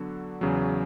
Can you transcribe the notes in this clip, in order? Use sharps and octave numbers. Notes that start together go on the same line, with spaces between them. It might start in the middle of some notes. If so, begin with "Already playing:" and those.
Already playing: D3 F#3 B3 D4 F#4
E2 C#3 F#3